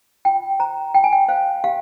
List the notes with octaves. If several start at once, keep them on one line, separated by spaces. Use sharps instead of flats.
F4 G5
C5 A#5
F4 G5
G#5
G5
C5 F5
G4 F5